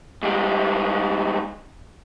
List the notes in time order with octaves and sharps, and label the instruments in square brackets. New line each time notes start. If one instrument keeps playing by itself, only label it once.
[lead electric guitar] G#2 G3